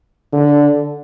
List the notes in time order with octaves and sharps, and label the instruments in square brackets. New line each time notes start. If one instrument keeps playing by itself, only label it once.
[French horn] D3